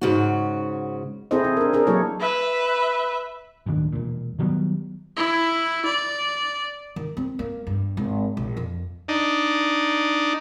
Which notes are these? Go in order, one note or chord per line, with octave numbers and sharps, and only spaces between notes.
G#2 C#3 F#4
C4 E4 G#4 A4 C5 D#5
E4
D4 A#4
D4 G#4 A#4
F#3 A#3 E4 G#4 A4 C#5
B4 E5
D1 D2 D#3 D4
E1 A#2
D#3 F#3 G3 B3
E4
D5
D#3
C4
A#3
G2
G#1
A#1
F2
D4 D#4